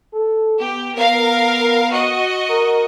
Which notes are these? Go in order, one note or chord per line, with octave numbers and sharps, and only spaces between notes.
A4
B3 G4
B3 A#4 F5
F#4 D#5
A#4